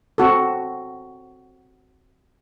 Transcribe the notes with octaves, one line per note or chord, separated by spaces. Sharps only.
C4 F#4 A4